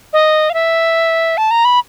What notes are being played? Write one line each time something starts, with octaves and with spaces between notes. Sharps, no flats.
D#5
F5
E5
A5
A#5
B5